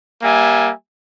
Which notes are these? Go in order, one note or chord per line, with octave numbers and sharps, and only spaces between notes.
G3 A#3 E5 G#5